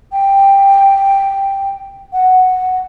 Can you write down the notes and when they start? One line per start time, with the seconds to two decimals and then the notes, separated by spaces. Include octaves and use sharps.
0.12 G5
2.13 F#5